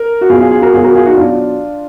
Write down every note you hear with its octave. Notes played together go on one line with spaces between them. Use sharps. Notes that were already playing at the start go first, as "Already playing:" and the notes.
Already playing: A#4
F#4
B2 F#3 F4 G#4
F4 G#4
F4 G#4
F#4 A#4
B2 F#3 F4 G#4
F#4 A#4
F4 G#4
D#4 F#4
B2 F#3 D4 F4